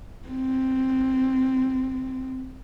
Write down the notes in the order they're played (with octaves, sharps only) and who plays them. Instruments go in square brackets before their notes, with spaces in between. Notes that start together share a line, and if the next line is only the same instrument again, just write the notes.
[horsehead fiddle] C4